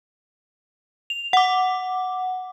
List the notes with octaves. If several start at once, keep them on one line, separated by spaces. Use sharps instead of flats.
F7
F#5 D6